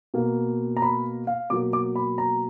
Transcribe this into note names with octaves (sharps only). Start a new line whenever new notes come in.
B2 A#3
A#5
B5
F5
B2 F#3 A#3 D6
D6
B5
A#5